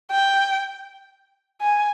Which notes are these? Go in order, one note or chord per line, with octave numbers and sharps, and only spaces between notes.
G5
G#5